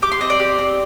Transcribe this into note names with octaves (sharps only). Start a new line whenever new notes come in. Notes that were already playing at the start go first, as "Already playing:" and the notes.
G4 D6
C6
C4 D#5
D5
G4
C4